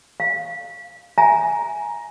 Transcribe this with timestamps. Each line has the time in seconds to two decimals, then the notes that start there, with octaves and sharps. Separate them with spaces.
0.20 F5
1.18 E5 G#5 A#5